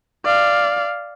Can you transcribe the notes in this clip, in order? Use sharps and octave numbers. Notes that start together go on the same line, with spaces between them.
D5 F5